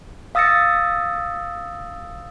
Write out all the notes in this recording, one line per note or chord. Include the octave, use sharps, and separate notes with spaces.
F5 D#6 E6 A6 A#6 C#7